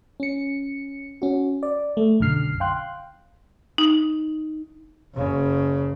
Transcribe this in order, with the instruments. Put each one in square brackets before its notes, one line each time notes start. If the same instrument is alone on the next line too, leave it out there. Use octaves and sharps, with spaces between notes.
[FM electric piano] C#4 C#7
C#4 F#4
D5
A3
B1 F#2 D3 F6 C7
F5 G5 C6 F#6
[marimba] D#4
[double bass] F#1 C#3